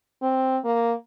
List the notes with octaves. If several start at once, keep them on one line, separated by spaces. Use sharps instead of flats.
C4
A#3